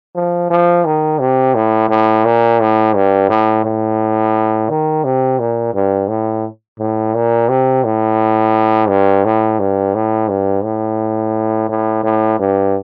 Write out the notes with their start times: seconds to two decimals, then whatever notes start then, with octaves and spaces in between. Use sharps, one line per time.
0.15 F3
0.50 F3
0.85 D#3
1.19 C3
1.55 A2
1.89 A2
2.25 A#2
2.60 A2
2.95 G2
3.30 A2
3.64 A2
4.70 D#3
5.04 C3
5.39 A#2
5.74 G2
6.09 A2
6.79 A2
7.14 A#2
7.49 C3
7.84 A2
8.89 G2
9.25 A2
9.60 G2
9.95 A2
10.29 G2
10.64 A2
11.69 A2
12.04 A2
12.40 G2